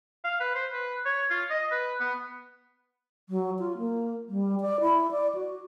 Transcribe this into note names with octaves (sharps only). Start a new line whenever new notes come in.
F5
B4
C5
B4
C#5
F4
D#5
B4
B3
F#3
F4
A#3
G3
D5
E4
D5
F#4